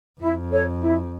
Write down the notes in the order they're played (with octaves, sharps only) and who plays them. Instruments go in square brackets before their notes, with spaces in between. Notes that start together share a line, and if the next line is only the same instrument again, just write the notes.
[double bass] F2 [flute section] E4
[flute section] A4 C#5
E4